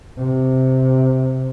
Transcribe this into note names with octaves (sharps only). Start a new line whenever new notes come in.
C3